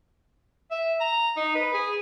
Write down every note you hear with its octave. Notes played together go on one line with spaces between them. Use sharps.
E5
A#5
D#4
B4
G#4